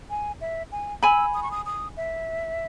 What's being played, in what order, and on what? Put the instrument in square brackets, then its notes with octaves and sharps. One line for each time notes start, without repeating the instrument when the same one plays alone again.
[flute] G#5
E5
G#5
[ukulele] G#5 B5 [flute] E6
[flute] D#6
C#6
D#6
D#6
E5